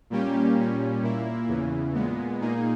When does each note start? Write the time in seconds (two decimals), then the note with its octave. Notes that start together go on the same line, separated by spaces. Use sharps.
0.10 A#2 G3 A#3 C#4 G4
0.57 A#2 G3 C#4
1.02 A#2 A#3 E4
1.48 E2 C#3 E3
1.94 A#2 G#3 B3
2.40 A#2 A#3 D#4 G#4